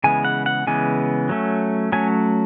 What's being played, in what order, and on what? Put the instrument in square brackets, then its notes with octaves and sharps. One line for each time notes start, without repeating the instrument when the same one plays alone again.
[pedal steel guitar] C#3 E3 G#3 B3 G#5
F#5
F#5
C#3 E3 G#3 B3 G#5
F#3 A3 C#4
F#3 A3 C#4 G#5